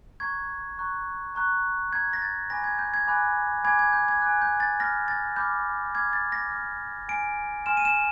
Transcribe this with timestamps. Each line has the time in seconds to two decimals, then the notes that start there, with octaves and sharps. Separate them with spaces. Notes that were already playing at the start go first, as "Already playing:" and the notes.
0.20 A#5 C#6 F#6 G#6
0.78 A#5 C#6 F#6
1.35 A#5 C#6 F#6
1.92 A#5 C#6 F#6 G#6
2.13 A#6
2.22 A6
2.50 G#5 B5 D6 F#6 A#6
2.64 G#6
2.79 G6
2.94 G#6
3.07 G#5 B5 D6 F#6
3.64 G#5 B5 D6 F#6 G#6
3.79 G#6
3.93 G6
4.08 G#6
4.22 G#5 B5 D6 F#6
4.42 G6
4.60 A6
4.79 B5 D6 F6 A#6
5.08 A6
5.36 B5 D6 F6 G6
5.95 B5 D6 F6 G#6
6.13 A6
6.32 A#6
6.52 B5 D6 F6
7.08 G#5 C6 F6 D7
7.66 G#5 C6 F6 E7
7.77 D#7
7.85 E7